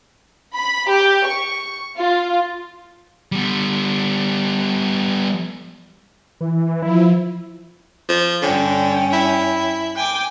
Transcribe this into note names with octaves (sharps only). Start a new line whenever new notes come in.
B5
G4
C#6
F4
G3 B3
E3
F3 E4
F3
G2 D3 C#4 G5
E4
G5 G#5 D6